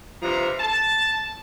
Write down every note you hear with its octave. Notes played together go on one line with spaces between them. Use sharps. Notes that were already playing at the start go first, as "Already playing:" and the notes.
G2 C3 F3 C5 A#5
A5